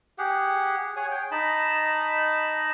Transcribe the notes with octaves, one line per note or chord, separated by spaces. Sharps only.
G4 G#4 F#5
G#4 C#5 F#5 G#5
G5
D#4 D#5 A5 B5